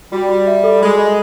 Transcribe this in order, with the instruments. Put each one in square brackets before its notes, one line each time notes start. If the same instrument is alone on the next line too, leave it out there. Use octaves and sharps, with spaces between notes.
[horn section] G3 [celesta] F#4
[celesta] F#4
E5
A4
[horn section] G#3 [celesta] B5
[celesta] D#5